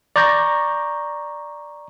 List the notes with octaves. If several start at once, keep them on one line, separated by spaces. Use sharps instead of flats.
D5 A#5 C#6 G6 A#6